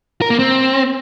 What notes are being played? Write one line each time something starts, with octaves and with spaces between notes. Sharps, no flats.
A#4
A#3
C4